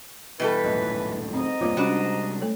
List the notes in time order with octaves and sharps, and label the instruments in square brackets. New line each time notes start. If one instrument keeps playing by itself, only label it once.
[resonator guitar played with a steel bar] B2 G3 A4 [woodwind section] E3 B4
[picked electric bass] D#1 F#2 A2 [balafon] D#5
[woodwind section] G#2 D#5 A#5 [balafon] C4
[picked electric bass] E1 G2 A#3 [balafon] F4 C#5 D6
[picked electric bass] C3 G3 G#3 [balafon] C#4 B5 [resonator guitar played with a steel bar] D4 F#4
[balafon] A3 A4 C#5